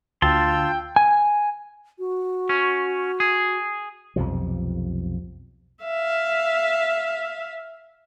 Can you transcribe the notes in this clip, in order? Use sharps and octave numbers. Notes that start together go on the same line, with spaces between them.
D2 F4 G5 A5 C6 E6
G#5
F#4
C#4
G#4
B1 F2 C3 F3
E5 F5